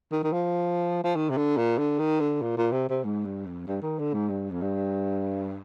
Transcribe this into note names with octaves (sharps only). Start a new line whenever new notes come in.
D#3
D#3
F3
F3
D#3
C3
D3
A#2
D3
D#3
D3
A#2
A#2
C3
C3
G#2
G2
F2
G2
D#3
D3
G#2
G2
F2
G2